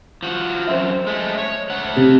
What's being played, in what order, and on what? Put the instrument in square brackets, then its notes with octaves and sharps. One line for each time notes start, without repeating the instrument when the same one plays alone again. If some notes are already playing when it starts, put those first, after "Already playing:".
[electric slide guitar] F3 F#4
[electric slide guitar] F#2 C4 [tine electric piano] C5 E5
[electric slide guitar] G#3 A3
C#5
A3 F#5
[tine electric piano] C3 C4 G4